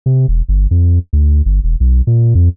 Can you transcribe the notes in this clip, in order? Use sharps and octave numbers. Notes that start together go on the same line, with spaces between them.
C3
E1
G1
F2
D2
G1
E1
B1
A#2
F2